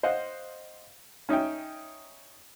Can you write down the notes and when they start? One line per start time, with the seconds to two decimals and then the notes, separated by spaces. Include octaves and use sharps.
0.03 C5 D#5 F5 F#5
1.29 C#4 D#4 E5 G5